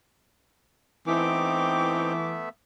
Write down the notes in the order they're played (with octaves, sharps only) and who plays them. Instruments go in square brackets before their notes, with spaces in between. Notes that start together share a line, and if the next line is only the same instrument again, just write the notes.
[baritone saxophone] E3 [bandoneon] A3 B3 E5 [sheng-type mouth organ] C4 D#4 G5 [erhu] D6